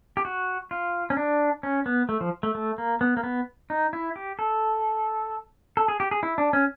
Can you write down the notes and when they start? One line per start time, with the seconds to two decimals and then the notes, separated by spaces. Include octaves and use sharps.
0.17 G4
0.25 F#4
0.71 F4
1.10 C#4
1.17 D4
1.63 C#4
1.86 B3
2.09 A3
2.21 F3
2.43 A3
2.55 A3
2.78 A#3
3.01 B3
3.17 A#3
3.24 B3
3.70 D#4
3.93 E4
4.16 G4
4.39 A4
5.77 A4
5.88 G#4
6.00 G4
6.11 G#4
6.23 E4
6.38 D4
6.53 C#4